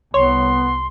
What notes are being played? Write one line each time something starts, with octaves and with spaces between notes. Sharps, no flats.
C2 B3 C#5 C6